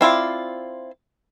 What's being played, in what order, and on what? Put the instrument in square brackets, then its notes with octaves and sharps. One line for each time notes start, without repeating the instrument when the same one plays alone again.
[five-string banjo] C4 E4 F4 D5